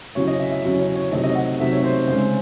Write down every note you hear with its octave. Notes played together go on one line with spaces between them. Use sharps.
C#3 F#3 C#4 E4 C#5
D#5
E5
E5
C#3 F#3 C#4 E4
C#5
C#5
C3 F#3 A3 D#4 D#5
D#5
F#5
C3 F#3 A3 D#4 E5
C#5
C5
C#3 G#3 C4 C5